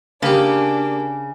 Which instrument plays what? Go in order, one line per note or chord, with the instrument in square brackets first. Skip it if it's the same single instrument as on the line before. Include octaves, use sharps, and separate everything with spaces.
[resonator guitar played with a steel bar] C#3 [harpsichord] A#3 G4 [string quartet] D4